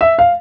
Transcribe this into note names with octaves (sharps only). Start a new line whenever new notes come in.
E5
F5